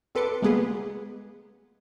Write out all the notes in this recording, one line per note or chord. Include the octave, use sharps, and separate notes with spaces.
C4 A4 B4 C6 D6 C#7
G#3 A#3 B3 G#4 B4